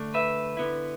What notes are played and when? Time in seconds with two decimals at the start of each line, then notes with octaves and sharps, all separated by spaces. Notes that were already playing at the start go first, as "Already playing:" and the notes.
Already playing: D2 D3 A3 D4
0.14 B4 E5
0.57 D3 B3 E4